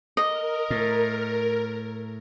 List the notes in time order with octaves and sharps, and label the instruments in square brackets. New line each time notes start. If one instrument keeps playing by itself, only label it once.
[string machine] A#4 [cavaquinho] D#5
[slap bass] A2